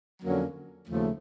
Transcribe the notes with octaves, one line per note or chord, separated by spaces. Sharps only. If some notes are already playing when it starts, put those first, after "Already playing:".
F2 D3 F#3 A#3 C#4
D#2 C#3 F3 A3